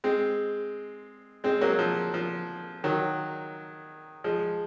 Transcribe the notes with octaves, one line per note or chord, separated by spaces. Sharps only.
G#3 C4
G#3 C4
F#3 A#3
F3
F3
D#3 F#3
F3 G#3